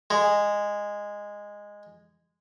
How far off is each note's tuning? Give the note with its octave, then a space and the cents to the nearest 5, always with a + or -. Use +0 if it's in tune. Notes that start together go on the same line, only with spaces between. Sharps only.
G#3 -10